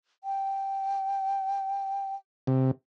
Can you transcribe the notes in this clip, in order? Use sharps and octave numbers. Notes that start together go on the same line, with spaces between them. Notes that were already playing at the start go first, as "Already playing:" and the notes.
G5
C3